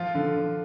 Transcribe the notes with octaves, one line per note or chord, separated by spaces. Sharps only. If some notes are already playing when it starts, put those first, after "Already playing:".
Already playing: F3 F4
D3
D3